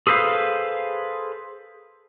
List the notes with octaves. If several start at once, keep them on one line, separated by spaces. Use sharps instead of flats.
G#4 A4 B4 C5 F5